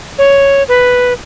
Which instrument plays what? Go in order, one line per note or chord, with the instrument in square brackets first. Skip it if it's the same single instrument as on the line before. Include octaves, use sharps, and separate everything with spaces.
[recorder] C#5
B4